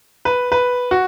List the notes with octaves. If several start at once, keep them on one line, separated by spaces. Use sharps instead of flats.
B4
B4
F#4